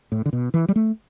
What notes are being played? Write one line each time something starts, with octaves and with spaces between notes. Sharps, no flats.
A2
D3
B2
E3
G3
A3